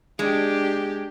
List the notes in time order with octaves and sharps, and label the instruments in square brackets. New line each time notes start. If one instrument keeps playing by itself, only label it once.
[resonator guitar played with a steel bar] G#3 [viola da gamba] D4 G4